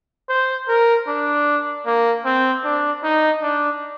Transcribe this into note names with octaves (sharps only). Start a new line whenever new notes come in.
C5
A#4
D4
A#3
C4
D4
D#4
D4